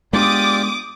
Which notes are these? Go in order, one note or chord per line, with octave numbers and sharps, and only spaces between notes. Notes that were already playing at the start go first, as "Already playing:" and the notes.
G#3 B3 D4 F4 G4 D5 D6 D#6